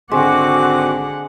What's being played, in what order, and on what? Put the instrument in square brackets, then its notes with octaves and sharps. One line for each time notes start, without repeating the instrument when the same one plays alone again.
[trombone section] G#1 C4 [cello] D3 F#5 [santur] G#3 [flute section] F#4 D6